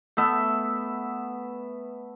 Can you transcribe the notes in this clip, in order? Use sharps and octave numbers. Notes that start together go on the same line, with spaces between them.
A3 B3 E5